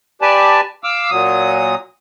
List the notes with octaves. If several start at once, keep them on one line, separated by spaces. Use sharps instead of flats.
G4 B4 D5 G#5 A5
F5 D6 E6
A#2 F#3 D#6